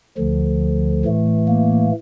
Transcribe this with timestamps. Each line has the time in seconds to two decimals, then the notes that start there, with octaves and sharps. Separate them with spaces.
0.17 D2 D3 F3
1.05 A2 E3 A3
1.48 A#3